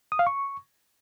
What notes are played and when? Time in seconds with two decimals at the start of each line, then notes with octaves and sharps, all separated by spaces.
0.12 D#6
0.19 F5
0.27 C#6